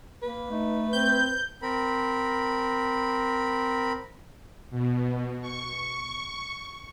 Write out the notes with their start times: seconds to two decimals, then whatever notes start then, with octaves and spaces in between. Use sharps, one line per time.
0.22 A#3 B4
0.51 A3 D#4
0.93 C4 G6
1.62 C4 A#4 B5
4.71 B2
5.41 C#6